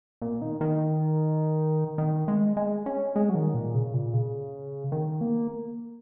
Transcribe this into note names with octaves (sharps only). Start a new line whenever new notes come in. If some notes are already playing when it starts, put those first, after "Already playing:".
A#2
D#3
D#3
D#3
G#3
G#3
C#4
G#3
F#3
D#3
A#2
C#3
A#2
C#3
D#3
A#3